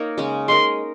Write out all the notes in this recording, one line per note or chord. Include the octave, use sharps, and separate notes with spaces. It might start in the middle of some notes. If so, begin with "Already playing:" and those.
Already playing: A#3 D#4 A#4 C#5
C#3 G#3 C#4 G#4
G#3 D#4 A#4 C6